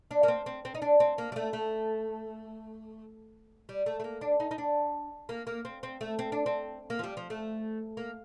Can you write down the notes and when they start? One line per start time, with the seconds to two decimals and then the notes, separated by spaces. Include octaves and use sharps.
0.11 D4
0.23 A#3
0.28 C4
0.46 C4
0.65 C4
0.75 D#4
0.82 D4
1.00 C4
1.18 A#3
1.32 G3
1.36 A3
1.53 A3
3.69 G3
3.86 A3
4.00 A3
4.04 A#3
4.21 D4
4.40 D#4
4.51 D#4
4.58 D4
5.29 A#3
5.47 A#3
5.65 C4
5.83 C4
6.01 A3
6.19 C4
6.32 D4
6.46 C4
6.90 A#3
6.99 F3
7.03 G3
7.17 F3
7.30 A3
7.97 A#3